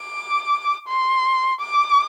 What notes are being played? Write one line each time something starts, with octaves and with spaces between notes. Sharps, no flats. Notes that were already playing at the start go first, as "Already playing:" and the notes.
Already playing: D6
C6
D6